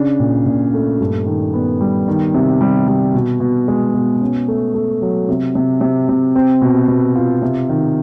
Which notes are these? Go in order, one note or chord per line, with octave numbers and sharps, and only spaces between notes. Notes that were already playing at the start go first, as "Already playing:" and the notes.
Already playing: C#3 D4
A#2
A#2
A3
G2
D#3
B3
G3
D#3
C3
G3
G3
B2
B2
G#3
B2
C#4
A3
A3
F#3
C3
C3
C3
C3
C4
B2
B2
F4
C3
D#3